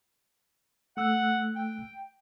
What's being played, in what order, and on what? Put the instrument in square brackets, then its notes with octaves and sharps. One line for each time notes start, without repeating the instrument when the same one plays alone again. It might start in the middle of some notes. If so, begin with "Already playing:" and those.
[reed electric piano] A3 E6 F#6 [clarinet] F#5
[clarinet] G5